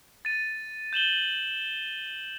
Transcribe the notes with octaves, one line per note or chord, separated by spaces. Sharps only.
A6 D#7
G6 E7 F#7 G7